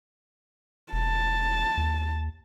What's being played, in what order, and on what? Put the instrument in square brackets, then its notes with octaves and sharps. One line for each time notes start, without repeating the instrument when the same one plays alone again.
[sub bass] E1 [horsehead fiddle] A5
[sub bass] D#2